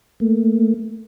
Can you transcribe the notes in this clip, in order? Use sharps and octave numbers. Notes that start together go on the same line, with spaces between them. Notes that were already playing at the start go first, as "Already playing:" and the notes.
A3 A#3